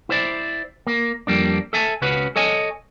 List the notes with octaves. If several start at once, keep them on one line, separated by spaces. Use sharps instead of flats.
E4 C5 D5
A#3
F2 G3 A#3 D4
A4 E5 G#5 A5
C#2 C#3 C#4 F#4 B4
A4 C#5 D#5 G#5